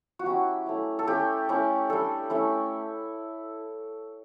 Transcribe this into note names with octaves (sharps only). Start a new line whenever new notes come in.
F#4
F#3 C#4 E4 G4
A3 C#4 E4
A4
A3 C#4 E4 G4
A3 C#4 E4
G3 D4 A4
A3 C#4 E4